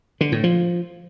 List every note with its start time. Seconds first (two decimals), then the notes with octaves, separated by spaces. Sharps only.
0.21 D3
0.32 A2
0.44 F3